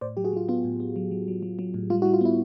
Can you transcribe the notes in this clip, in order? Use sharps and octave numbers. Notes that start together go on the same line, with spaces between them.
A2 C5 D5
F#3 G4
F#4 G#4
F#3 F4
B3 F4
A2
B3
F#3
F#3
F#3
F#3
F#3
A2
G3 F4
E4 F#4
G3
F4
B3 E4